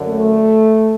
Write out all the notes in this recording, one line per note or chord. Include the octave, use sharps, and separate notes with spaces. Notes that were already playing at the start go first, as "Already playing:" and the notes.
Already playing: F#2 D3
A3